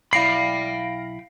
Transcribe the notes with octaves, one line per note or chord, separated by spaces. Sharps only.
B1 E4 F5 G5 B5 A#6 C7 D7